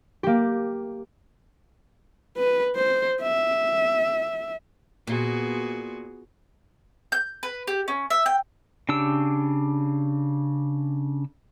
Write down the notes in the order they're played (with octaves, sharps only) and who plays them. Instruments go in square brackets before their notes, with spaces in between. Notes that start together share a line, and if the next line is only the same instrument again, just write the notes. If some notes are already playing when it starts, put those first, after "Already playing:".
[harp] A#3 G4
[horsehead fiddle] B4
C5
E5
[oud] A#2 [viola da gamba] B3 F#4 G#4
[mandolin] G6
B4
G4
C#4
E5
G5
[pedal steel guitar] C#3 D4 G4 E6